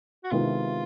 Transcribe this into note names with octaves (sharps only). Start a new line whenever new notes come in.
F#4
C3 D#3 G#3 B3 E4 F4